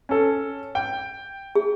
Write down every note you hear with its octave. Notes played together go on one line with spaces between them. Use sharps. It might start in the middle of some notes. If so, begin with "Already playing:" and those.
C#4 A4
G5
G#4